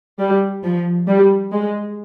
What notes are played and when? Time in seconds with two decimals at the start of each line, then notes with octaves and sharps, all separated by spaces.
0.19 G3
0.64 F3
1.08 G3
1.52 G#3